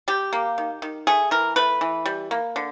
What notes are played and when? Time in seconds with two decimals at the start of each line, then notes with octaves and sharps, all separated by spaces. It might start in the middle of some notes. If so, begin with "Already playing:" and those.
0.08 G3 G4
0.33 A#3
0.58 D#3
0.82 D#3
1.07 A3 G#4
1.31 E3 A#4
1.56 A3 B4
1.81 E3
2.06 G3
2.31 A#3
2.56 D3